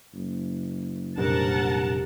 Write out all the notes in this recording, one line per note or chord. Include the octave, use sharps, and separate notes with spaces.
F#1
F1 A#2 G3 D4 A#4 F#5 A5